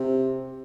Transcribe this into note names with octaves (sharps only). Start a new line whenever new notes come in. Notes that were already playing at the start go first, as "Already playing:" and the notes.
Already playing: C3